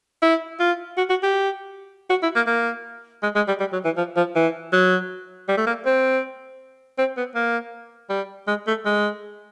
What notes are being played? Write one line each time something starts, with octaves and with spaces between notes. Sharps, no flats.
E4
F4
F#4
F#4
G4
F#4
E4
A#3
A#3
G#3
G#3
G3
G3
F#3
E3
F3
F3
E3
F#3
G3
A3
A#3
C4
C4
B3
A#3
G3
G#3
A3
G#3